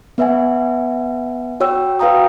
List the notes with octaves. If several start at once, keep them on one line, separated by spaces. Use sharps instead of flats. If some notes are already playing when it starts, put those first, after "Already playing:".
B3 B4 E5 F#5 G#5
F#4 C#5 G5 E6
F#4 B4 F5 G5 A#5 D#6